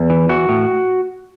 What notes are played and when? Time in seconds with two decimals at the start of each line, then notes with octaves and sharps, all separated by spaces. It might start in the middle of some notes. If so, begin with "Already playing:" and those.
Already playing: E2
0.10 E3
0.29 E3 F#4
0.49 A2